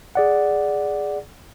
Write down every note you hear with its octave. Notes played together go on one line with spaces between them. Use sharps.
G#4 D5 F#5